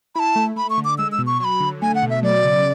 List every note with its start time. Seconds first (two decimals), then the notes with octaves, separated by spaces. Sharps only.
0.15 E4 A5 B5
0.36 A3
0.56 A3 B5
0.70 C#6
0.78 D3
0.85 D6
0.98 G#3 E6
1.12 E6
1.19 B2
1.27 C#6
1.40 F#3 B5 C#6
1.60 D3
1.82 A3 G#5
1.95 F#5
2.03 B2
2.10 E5
2.23 F#3 D5
2.44 C#3